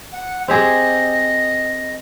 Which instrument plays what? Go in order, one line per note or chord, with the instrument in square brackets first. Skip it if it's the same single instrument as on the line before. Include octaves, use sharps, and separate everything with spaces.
[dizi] F#5
[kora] C4 G4 G#4 [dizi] D#5